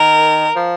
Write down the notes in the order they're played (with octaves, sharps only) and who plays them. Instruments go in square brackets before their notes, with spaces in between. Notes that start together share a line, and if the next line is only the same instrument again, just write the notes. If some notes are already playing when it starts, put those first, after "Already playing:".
Already playing: [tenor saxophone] D#3 [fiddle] A#4
[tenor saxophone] F3